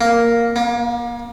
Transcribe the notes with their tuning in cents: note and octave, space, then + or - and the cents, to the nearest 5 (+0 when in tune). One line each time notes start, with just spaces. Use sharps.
A#3 +0
A#3 +35